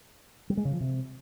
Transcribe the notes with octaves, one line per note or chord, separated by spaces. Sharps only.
G3
G#3
C#3
F3
C3